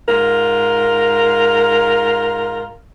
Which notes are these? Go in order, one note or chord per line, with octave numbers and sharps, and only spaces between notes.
G#2 F4 A#4